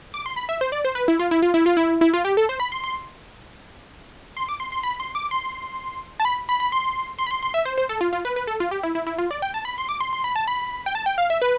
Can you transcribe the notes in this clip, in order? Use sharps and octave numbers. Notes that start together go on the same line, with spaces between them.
D6
C6
B5
E5
C5
D5
C5
B4
E4
F4
E4
F4
E4
F4
E4
E4
F4
G4
A4
C5
B5
C6
C6
C6
D6
C6
C6
B5
C6
D6
C6
A5
B5
B5
B5
C6
C6
B5
C6
C6
E5
C5
C5
A4
F4
F4
B4
B4
A4
F4
G4
E4
E4
E4
F4
D5
G5
A5
B5
C6
D6
C6
C6
B5
A5
B5
G5
A5
G5
F5
E5
B4